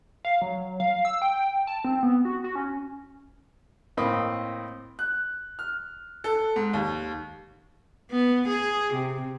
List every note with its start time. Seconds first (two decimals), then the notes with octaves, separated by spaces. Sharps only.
0.25 F5
0.42 F#3
0.80 F5
1.05 E6
1.22 G5
1.67 A5
1.84 C4
2.03 B3
2.25 F#4
2.44 F#4
2.55 C#4
3.97 A2 A#3 C4 D#5 B5
4.99 F#6
5.59 F6
6.24 A4
6.56 G#2
6.74 D#2
8.11 B3
8.48 G#4
8.94 C3